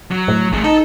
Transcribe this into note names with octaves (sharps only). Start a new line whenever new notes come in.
F#3
A2
A1 A3 G#4
D#4 A4